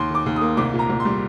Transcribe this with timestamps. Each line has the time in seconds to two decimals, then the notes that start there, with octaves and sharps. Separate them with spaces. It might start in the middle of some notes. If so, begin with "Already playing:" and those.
Already playing: D#2 C6
0.10 D#3 D6
0.26 D#2
0.36 A#3 D#6
0.57 C2 D6
0.74 A#2
0.79 A#5
0.89 C2
1.00 C6
1.05 G3